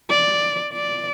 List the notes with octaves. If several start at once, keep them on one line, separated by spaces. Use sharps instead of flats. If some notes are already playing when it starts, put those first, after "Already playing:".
D5
D5